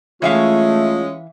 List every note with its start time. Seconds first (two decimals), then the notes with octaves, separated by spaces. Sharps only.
0.22 E3 G#3 A3 C#4 F4 E5 F5